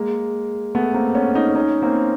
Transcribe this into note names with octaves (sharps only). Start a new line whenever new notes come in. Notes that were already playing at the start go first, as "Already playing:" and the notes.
Already playing: G#3 A#3
A3 B3
A#3 C4
B3 C#4
C#4 D#4
C#4 D#4
A#3 C4